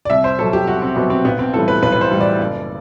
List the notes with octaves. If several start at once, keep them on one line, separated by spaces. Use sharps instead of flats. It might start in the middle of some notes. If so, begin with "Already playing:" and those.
D5
C2 E5
C5
B2 F#3 A4
G4
C2 F#4
C4
B2 F#3 B3
C4
B1 B3
C4
A2 E3 G3 A4
B4
B1 B4
B4
C5
A2 E3 G3
D5
F#1